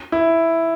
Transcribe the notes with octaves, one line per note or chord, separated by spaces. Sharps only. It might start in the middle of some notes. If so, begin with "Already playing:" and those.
E4